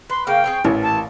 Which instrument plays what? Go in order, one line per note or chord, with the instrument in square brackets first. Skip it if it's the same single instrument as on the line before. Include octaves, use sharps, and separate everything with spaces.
[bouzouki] B4 [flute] C6
[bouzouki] C#3 A#3 F5 [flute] G5
[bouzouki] C4 G#4 C#5
[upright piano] A1 E3 [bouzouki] A#2
[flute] A5